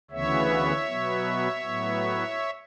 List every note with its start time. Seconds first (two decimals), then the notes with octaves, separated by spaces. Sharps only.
0.11 D2 C#3 E3 B3 C#5 E5
0.87 B2 F#3 B3
1.63 A2 F#3 B3